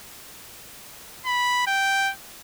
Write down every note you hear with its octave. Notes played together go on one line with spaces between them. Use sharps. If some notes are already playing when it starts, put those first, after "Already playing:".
B5
G5